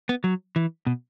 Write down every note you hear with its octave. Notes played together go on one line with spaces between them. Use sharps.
B3
F#3
E3
B2